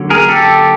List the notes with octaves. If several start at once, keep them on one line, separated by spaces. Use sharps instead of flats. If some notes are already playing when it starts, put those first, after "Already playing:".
Already playing: D3 F#3 A#3 C#4
G#4 A#4
G4 A4